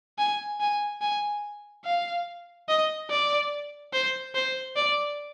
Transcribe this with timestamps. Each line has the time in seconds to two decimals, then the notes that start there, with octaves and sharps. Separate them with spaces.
0.18 G#5
0.60 G#5
1.02 G#5
1.85 F5
2.69 D#5
3.10 D5
3.93 C5
4.35 C5
4.76 D5